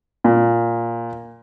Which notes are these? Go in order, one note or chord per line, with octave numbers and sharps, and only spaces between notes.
A#2